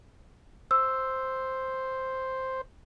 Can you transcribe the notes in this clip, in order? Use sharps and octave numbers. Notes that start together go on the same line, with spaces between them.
C5 E6